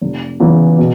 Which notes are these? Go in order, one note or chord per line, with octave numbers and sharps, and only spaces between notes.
F1
E2 C#3 E3
B2